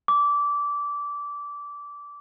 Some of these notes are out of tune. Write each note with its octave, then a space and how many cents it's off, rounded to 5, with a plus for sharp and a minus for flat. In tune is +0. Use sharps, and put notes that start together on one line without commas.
D6 -20